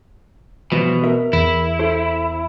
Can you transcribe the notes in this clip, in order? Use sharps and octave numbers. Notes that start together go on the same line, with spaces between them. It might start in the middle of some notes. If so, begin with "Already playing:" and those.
B2 E3 F3 G3
A#4 E5
E2 E4
A4 C5